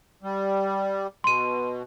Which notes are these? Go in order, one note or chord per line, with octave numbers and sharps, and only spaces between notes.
G3
B2 C6 D#7